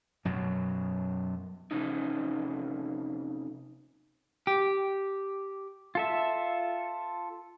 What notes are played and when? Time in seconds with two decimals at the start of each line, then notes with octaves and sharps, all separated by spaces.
0.25 F#2 B2 F#3
1.71 F2 C3 C#4 D#4
4.47 G4
5.95 F4 A4 E5